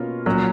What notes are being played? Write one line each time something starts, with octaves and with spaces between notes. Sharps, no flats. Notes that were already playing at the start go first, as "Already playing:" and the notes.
Already playing: B2 A#3 C#4 F4
A#2 F#3 C#4